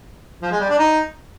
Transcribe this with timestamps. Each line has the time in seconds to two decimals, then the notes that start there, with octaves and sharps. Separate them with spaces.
0.42 F3
0.51 G#3
0.60 G3
0.69 D4
0.78 D#4